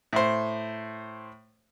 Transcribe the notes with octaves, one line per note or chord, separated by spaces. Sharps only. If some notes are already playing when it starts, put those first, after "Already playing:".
A2 C5